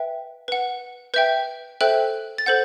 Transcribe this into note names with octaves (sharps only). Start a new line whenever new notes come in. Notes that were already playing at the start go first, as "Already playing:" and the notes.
Already playing: B4 E5 G5
B4 F#5
B4 E5 G5 G6
A4 C5 E5 G5 F#6
A6
A4 C5 F#5 G6